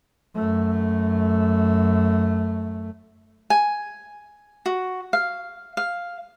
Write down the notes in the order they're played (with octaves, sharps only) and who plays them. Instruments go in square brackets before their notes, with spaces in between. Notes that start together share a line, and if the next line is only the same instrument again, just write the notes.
[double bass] F#2 A3
[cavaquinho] G#5
F#4
F5
F5